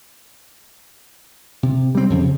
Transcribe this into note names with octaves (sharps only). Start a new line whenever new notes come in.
C3
G3 C4
F2 C#3